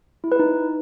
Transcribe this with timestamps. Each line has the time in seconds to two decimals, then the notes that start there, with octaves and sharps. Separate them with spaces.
0.24 E4
0.32 B4
0.39 D#4